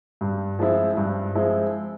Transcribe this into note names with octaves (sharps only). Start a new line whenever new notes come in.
G2
F3 G#3 C4 E4
G2
F3 G#3 C4 E4